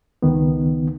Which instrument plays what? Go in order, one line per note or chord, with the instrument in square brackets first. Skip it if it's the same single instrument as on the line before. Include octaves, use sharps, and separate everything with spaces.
[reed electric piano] C#2 D#3 B3